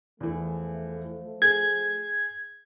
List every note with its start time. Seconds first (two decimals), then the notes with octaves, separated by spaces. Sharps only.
0.20 E2 E3 F3 A3
1.42 G#4 G#6